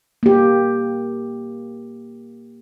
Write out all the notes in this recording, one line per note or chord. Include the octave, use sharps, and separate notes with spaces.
A#3 G4